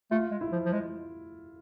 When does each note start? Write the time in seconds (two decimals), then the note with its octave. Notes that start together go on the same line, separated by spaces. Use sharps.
0.11 A3 F4
0.31 G#3
0.41 E4
0.52 F3
0.65 F3
0.73 G#3